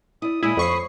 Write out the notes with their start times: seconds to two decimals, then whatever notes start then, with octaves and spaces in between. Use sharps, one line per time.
0.22 E4 D5 D#6
0.43 A#2 G#3 E4 B5 D#6
0.57 F2 C5 C#5 C#6 C7